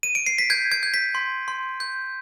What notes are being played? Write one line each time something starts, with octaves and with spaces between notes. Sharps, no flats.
D#7
D7
C7
B6
G6 G#6
G#6
G6
B6
C6
C6
G6